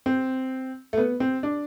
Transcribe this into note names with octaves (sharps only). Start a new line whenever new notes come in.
C4
A3
B3
C4
D4